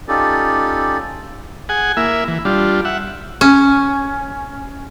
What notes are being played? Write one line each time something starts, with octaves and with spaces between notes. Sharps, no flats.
C#4 D#4 F4 G4 A4 D5
G#4 F#5 G#5
A#3 E4 E5
E3
G3 D4 F4
E5 F#5
C#4